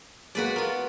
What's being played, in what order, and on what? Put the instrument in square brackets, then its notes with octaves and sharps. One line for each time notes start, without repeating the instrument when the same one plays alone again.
[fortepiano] F#3 G#3 A#3 [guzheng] F#4 B4 D5
[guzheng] B3 F4 [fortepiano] A#4